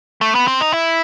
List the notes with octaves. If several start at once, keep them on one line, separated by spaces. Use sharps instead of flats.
A3
B3
C4
D#4
E4